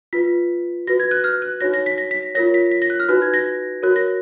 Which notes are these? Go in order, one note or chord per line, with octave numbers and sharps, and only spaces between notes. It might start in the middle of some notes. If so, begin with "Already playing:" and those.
F4 B4 B6
F#4 B4 A#6
G#6
F#6
F6
F#6
D#4 F#4 C#5 A#6
A#6
B6
A#6
B6
F4 A#4 C#5 A#6
B6
B6
A#6
F#6
F6
D#4 F#4 B4 F#6
G#6
A#6
F#4 A#4 C#5 F#6
A#6